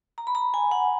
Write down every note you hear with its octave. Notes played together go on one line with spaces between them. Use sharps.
A#5
B5
A#5
G#5
F#5